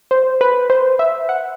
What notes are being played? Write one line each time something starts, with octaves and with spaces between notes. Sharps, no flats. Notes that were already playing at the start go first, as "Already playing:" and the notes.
C5
B4
C5
E5
F#5